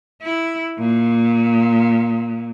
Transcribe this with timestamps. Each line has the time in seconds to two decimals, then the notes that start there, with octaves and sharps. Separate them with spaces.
0.23 E4
0.79 A#2